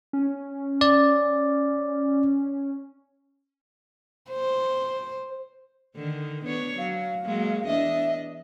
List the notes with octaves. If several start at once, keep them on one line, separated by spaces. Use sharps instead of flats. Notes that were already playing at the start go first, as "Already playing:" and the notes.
C#4
D5
C5
D3 D#3
B3 D4 C#5
F#3 F5
F#3 G#3 A#3
E2 D4 D#5 E5